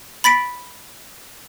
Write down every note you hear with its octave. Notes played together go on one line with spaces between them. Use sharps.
B5 A6 B6 D7